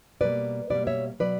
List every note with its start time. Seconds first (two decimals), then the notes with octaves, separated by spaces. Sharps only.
0.21 B2 G3 A#3 B4 D5
0.70 B2 G3 A#3 B4 D5
0.87 C#5 E5
1.19 B2 F#3 B3 B4 D5